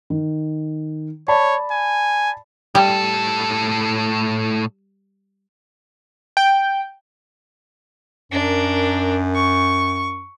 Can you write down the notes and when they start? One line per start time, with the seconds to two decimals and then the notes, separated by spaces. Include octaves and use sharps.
0.10 D#3
1.28 C#5 D5 A5 B5
1.72 G#5
2.75 A2 G3 A4
6.37 G5
8.32 F#2 D4 A#4
9.34 C#6